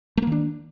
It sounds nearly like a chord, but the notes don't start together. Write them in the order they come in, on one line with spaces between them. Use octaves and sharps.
A3 A#3 D#3 D4